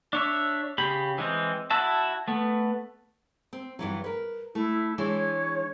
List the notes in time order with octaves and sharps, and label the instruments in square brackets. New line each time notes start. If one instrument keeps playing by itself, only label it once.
[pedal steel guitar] D4 C#5 E5
C#3 G4 B5
E3 G#3 C4
E4 F#4 E5 A5
A3 B3
[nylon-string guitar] C4
G2 E3 F#3
A#4 B4
[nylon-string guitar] A3 [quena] E4
[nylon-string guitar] E3 G#3 D4 [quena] C#5